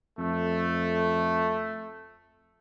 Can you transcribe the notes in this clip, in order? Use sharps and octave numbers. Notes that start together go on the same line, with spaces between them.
F2 A3